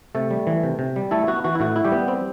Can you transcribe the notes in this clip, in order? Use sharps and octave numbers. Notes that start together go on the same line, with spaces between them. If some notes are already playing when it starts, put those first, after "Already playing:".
C3 A3 A4
G3
E3
C3
C3
G3
A3 E4 A4
B3 F#4
E3 F#4
E4
A2 F#4
E4
G3 G4
B3
C4